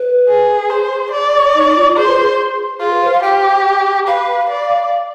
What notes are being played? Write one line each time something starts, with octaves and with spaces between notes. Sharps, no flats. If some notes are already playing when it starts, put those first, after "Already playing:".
Already playing: B4
G#4
G#4 C5
D5
D#4
D#4
F4
F4
G#4 C5
B4
G#4
F4 G#4
B4
C5
F5
G4 G5
B4 F5
D5